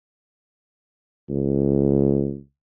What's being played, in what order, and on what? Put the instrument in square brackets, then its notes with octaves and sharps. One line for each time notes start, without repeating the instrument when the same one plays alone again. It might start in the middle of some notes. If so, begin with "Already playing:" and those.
[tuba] C#2